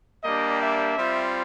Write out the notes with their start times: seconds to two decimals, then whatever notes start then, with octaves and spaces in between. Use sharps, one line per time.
0.24 G3 A#3 D4 G4 D#5
0.61 E5
0.97 G3 C4 F4